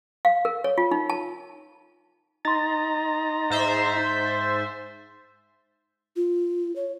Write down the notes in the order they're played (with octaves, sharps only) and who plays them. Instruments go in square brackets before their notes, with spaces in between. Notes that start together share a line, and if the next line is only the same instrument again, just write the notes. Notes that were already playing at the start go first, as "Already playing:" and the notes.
[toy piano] F5
A#4
C#5
F4
D#4
A5
[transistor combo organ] D#4 A#5 [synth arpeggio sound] C6 A6
[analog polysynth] G#2 C5 E5
[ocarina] F4
C#5